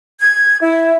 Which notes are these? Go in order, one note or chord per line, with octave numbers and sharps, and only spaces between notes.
G#6
E4